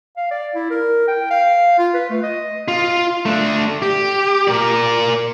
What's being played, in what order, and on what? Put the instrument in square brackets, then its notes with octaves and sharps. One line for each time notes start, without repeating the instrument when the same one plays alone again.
[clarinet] F5
D5
E4
A#4
G5
F5
F4
B4
A3
D#5
[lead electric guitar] F4
A3 D4
G4
A#4 D5